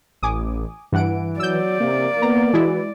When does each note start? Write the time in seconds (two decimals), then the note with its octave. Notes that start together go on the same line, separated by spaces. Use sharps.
0.23 A1 G#5 D6 D#6
0.92 G2 E3 F#5 D7
1.40 F#3 D5 E6 G6
1.80 C3 A#3
2.22 B3 A#5
2.53 E3 G#3 E4 F#4